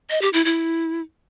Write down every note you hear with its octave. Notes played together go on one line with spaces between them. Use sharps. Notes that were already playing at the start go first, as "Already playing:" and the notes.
D#5
G4
E4
E4